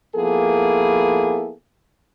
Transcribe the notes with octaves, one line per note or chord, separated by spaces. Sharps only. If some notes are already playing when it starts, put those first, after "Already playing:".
F3 A#3 B3 E4 G#4 A4